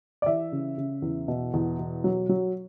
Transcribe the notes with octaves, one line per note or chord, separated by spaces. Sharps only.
D5
E3 E5
C#3
C#3
E2
B2
E2
B2
F#3
F#3